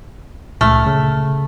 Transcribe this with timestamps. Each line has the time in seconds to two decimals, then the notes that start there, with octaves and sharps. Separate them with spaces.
0.61 C#2 A#2 A3 F6
0.86 C#3